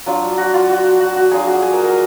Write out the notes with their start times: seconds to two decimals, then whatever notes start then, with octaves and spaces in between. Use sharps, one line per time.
0.06 F#3 D4 F4
0.38 F#4
0.54 F4
0.70 F#4
1.00 F#4
1.16 F#4
1.31 F#3 D4 F4 G#4
1.47 F#4
1.62 G#4
1.73 A#4
1.83 A#4